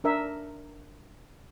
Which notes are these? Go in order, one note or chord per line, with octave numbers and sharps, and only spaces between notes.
D4 A#4 E5